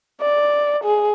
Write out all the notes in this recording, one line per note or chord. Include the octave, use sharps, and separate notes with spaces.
D5
G#4